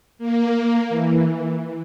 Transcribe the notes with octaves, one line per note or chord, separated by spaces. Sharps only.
A#3
E3